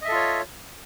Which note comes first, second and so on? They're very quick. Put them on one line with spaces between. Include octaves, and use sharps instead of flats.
D#5 E5 A4 F4 C#5